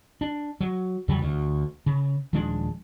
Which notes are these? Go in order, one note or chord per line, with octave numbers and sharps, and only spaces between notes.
D4
F#3
E2 C#3 F#3 G3
D2
C#3
D#1 F3 G#3 D4